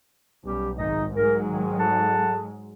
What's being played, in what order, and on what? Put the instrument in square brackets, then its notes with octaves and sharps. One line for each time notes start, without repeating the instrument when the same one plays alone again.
[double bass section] B1 [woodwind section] G3 C#4 G4
[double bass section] G#1 [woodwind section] D#4 D#5
[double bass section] G#2 F#3 G#3 [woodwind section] A#4
[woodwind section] D#3
A4 F#5 A5